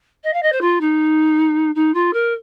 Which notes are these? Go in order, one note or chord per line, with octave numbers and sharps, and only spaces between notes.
D#5
F5
D#5
C5
F4
D#4
D#4
F4
A#4